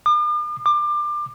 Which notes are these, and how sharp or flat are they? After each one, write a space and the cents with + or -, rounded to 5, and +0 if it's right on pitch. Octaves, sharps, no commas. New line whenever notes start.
D6 +45
D6 +25